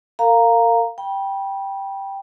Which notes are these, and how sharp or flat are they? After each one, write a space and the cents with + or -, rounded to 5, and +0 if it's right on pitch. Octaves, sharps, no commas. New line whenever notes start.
A#4 -35 F5 +0 A#5 +0
G5 +0 B5 -30